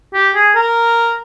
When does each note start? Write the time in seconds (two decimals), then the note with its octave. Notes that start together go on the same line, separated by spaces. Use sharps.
0.14 G4
0.35 G#4
0.56 A#4